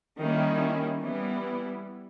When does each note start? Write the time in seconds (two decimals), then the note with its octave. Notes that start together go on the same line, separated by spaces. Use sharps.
0.19 D#3 G3 A#3 C#4 E4
1.01 E3 G3 B3 E4